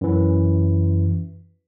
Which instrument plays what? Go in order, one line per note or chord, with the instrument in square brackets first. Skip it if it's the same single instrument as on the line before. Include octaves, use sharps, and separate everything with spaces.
[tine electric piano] F#2 E3